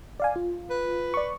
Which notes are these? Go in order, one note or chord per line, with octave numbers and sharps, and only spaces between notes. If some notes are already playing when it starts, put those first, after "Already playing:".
D5 F5 G#5
F4
B4
D5 C#6